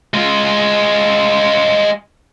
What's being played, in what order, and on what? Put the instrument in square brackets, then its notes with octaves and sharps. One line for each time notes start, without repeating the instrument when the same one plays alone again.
[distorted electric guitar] G#3 F4